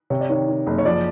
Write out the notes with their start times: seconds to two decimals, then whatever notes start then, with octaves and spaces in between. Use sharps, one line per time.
0.10 C3 C#5
0.20 D5
0.29 D#3 C#5
0.48 D#3
0.67 F#1
0.78 C#5
0.85 F3 D5